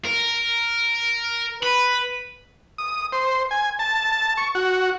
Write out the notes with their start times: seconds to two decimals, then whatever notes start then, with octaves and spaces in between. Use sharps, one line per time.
0.05 A#4
1.63 B4 B5
2.78 D#6
3.12 C5
3.51 G#5
3.79 A5
4.37 C#6
4.55 F#4